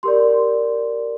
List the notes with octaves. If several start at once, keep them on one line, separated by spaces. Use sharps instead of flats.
G4 A#4 D5 C6